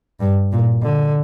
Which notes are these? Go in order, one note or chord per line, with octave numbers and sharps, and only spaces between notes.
G2
A#2
D3